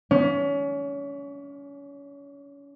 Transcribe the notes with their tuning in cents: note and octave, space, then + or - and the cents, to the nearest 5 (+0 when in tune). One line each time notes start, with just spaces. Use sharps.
C#4 +30